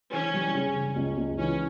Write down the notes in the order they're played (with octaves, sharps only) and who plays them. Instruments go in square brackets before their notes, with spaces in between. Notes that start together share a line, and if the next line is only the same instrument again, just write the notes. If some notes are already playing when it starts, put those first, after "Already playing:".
[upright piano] E3 [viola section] C#4
[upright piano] G3
C#3
C#3
C#2
C#2
[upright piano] E3 [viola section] C#4